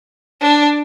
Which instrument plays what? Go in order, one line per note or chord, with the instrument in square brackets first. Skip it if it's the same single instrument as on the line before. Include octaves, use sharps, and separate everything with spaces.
[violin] D4